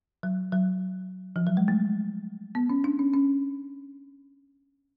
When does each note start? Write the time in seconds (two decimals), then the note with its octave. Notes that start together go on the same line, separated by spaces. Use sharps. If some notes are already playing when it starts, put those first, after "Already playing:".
0.23 F#3
0.52 F#3
1.36 F3
1.47 F#3
1.57 G#3
1.68 A3
2.55 B3
2.70 C#4
2.84 D4
2.99 C#4
3.13 C#4